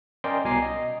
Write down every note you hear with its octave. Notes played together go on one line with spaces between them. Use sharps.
C#4 A#4 D5 D#5 G5 C6
C2 B2 G#5 A#5 D6 C7
D#5